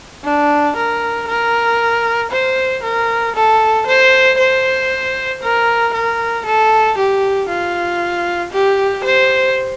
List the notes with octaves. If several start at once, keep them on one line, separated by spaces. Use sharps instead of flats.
D4
A#4
A#4
C5
A#4
A4
C5
C5
A#4
A#4
A4
G4
F4
G4
C5